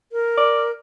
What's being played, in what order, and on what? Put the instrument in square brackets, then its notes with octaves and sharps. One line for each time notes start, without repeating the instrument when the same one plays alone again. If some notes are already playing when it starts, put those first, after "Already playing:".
[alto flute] A#4
[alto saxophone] D5